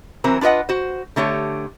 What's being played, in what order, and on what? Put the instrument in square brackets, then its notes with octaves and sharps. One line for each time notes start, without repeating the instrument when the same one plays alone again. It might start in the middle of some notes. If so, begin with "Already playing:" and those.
[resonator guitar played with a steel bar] E3 F#3 C4 A#4
D4 F4 B4 D#5 F#5
F#4 C5
D3 A3 G4 C#5